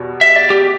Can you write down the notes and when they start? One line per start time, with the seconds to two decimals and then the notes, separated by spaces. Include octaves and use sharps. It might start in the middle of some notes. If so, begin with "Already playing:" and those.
Already playing: E2 B2 G3
0.21 E5
0.36 D5
0.50 G4